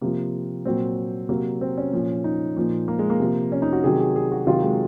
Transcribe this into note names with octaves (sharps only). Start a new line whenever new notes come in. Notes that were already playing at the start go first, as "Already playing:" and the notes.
C3 F3 A#3
A#2 F#3 C4
C3 F#3 A#3
C4
C#4
A#2 F3
D#4
A#2 F3
A#3
G#3
A#3
C3 F3
C#4
D#4
F#4
C3 D#3 F#3 G#4
G#4
G#4
F#4
C3 D#3 F#3 F4
G#3